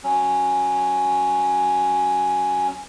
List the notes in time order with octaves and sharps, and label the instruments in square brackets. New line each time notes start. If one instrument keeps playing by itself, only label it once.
[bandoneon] F#3 C#4